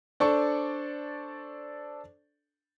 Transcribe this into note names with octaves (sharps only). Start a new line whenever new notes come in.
D4 A4 C5 D5 C#6